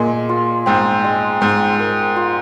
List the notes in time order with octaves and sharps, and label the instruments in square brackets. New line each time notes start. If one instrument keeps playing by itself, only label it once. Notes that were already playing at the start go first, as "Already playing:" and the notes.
Already playing: [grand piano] A#2 [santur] G#3
[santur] F4
[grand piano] G#2 [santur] C4
[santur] G#3
[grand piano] G#2 [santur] C4
[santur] A#4
F4